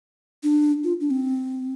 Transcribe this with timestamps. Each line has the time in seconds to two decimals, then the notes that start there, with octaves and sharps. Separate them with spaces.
0.43 D4
0.84 F4
1.01 D4
1.11 C4